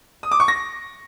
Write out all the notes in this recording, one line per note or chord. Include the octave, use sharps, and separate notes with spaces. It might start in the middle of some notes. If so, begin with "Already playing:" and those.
D#6
D6
C#6
A#6